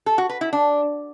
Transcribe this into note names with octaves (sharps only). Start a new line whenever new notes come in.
A4
F#4
B4
E4
D4